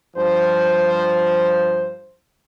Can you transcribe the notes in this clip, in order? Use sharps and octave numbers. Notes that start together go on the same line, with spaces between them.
G2 F3 C5